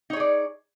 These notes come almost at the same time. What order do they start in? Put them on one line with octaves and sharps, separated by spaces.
D#4 C#5 G#4 D5